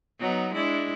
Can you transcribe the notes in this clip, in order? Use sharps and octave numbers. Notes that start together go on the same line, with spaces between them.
F#3 B3 D#4
G#3 D4 E4